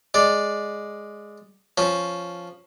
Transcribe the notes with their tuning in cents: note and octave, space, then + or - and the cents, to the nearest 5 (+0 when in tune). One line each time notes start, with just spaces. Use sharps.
G#3 +0 D5 +0
F3 +0 C#4 +0